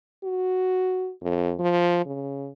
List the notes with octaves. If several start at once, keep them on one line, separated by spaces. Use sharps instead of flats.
F#4
F2
F3
C#3